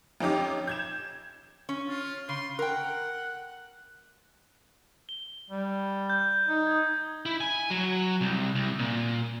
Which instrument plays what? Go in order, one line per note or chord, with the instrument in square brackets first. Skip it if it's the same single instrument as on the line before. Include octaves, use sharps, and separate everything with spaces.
[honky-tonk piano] F2 C#4 D#4 G4 D6
G6 G#6 E7
[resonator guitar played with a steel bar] C#4
[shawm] F4
[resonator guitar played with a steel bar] C#3 [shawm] C6
[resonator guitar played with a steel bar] A#4 G5 [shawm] F#5
[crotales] G7
[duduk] G3
[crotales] G6
[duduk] D#4
[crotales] D#6 G#6
[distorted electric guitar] E4
G#5
F#3
C2
C2
A#2